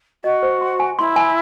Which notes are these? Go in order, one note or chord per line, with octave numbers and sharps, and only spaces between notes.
F#4 D#5
C5
C6
G#5
E4 C6
G#5